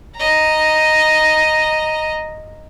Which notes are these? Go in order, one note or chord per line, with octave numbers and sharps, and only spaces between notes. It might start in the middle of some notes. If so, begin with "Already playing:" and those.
D#5 A#5